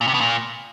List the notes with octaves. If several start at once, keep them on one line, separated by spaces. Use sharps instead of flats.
A#2
C3
B2
A#2